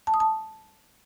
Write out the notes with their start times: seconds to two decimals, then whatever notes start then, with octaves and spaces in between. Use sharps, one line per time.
0.07 A5
0.14 D#6
0.20 A5